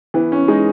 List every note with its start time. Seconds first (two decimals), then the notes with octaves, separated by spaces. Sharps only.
0.14 E3 B3
0.32 C#4
0.48 G#3 D#4